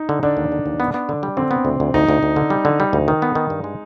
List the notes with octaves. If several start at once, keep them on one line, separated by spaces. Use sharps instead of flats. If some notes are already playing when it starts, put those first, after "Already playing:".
Already playing: D#4
D3
D3 D4
D#2
D3
D#2
B3
B3
D3
G3
D3 C4
B3
D2
D2
D2 D#4
D2
D2
D3
G3
D3
G3
D2
D#3
B3
D#3
G2
G#3